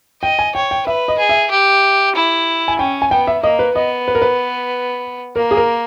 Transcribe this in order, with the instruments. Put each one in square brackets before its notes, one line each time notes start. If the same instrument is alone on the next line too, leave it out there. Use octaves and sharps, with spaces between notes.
[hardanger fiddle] D#5 [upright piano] G5
[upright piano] G#5
[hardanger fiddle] C#5 [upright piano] G5
[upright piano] G5
[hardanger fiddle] B4 [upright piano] E5
[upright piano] D#5
[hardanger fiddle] G#4
[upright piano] E5
[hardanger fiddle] G4
E4
[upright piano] G#5
[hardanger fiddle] C#4 [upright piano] G5
[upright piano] G#5
[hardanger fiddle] B3 [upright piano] G5
[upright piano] E5
[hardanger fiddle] A#3 [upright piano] D#5
[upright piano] B4
[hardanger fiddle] B3 [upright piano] D#5
[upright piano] B4
A#4
B4
[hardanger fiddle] A#3 [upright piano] A#4
[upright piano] G#4
A#4